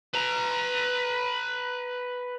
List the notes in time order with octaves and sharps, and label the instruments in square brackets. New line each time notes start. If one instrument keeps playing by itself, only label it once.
[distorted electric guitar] B4 A#5